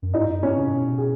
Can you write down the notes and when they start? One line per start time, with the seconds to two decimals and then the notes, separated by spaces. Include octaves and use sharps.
0.02 F#2
0.14 G#2 D#4 D#5
0.29 F#2
0.43 G#2 C#4 C#5
0.58 C#3
0.67 G#2
0.73 B2
0.98 G#4